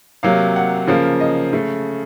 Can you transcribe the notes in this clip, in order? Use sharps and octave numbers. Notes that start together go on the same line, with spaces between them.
C3 F#3 A#3 F5
F#5
C#3 F3 A#3 F5
D#5
C#3 A3